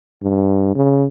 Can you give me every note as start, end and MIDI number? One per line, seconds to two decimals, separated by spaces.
0.22 0.73 43
0.75 1.06 49